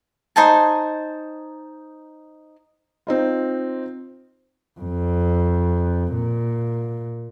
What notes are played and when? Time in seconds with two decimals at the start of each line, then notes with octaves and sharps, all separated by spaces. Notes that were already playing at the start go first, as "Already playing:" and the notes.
0.36 D#4 C5 G#5 A5
3.07 C4 D#4 F4
4.80 F2
6.13 A#2